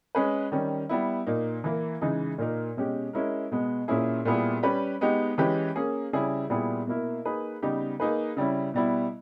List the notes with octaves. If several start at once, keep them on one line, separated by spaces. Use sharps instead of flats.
G#3 C#4 G#4 B4
D#3 G3 C#4
G3 B3 E4
A#2 A#3 D#4
E3 A#3 E4
C#3 E3 G#3 D#4 G#4
A#2 A#3 D#4 A#4
B2 G#3 C#4 G4
G#3 C#4 E4 A#4
B2 G#3 B3
A#2 A#3 C#4 E4 G#4
A#2 G3 B3 E4 G#4
G3 C#4 G4 B4
G#3 B3 D#4 G4
E3 G#3 C#4 G4 B4
A#3 C#4 G#4
C#3 G3 C#4 E4 G#4
A#2 G3 B3 E4 G#4
B2 A#3 E4 A#4
A#3 D#4 G#4 B4
C#3 G3 B3 D#4 G4
A#3 D#4 G#4 B4
C#3 G3 C#4 E4
B2 G3 B3 E4